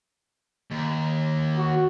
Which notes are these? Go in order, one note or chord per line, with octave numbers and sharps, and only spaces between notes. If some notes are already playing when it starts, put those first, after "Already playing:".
D#2
F#4